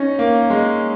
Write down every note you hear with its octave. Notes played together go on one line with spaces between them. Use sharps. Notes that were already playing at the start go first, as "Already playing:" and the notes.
Already playing: C#4 D#4
A#3
G#3